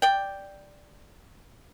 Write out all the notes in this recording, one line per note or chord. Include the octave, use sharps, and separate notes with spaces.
D5 G5